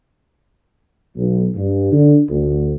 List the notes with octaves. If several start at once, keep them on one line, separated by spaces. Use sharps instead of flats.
B1
G2
D3
D2